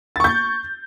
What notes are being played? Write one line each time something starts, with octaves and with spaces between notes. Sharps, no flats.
C#6 G6 A6